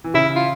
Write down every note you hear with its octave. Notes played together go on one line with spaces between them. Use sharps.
E3
C#3 E4
F4